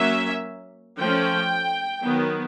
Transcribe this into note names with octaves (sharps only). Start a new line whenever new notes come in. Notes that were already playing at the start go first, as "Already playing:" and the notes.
Already playing: F#3 A#3 C#4 E5
F3 A3 C#4 G5
D#3 F#3 B3